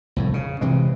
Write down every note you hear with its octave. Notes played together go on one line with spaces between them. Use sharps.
C2 F2 A2
C#3
C3 E3 G#3